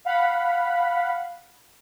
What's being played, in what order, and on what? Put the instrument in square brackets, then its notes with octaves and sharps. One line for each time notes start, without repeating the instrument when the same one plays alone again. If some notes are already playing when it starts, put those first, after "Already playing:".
[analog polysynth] F5 F#5 B5